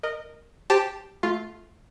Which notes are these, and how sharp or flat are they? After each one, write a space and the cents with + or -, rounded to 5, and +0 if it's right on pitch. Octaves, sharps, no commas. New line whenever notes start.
A#4 +0 D#5 -20
G4 +0 C5 +0 A5 +0
A3 -20 F4 +0